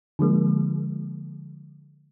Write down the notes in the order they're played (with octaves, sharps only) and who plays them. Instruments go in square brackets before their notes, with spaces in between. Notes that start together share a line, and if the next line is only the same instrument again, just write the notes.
[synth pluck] D3 F3 G#3 A#3